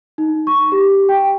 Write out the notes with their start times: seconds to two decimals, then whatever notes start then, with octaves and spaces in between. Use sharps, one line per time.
0.18 D#4
0.47 C#6
0.72 G4
1.09 G5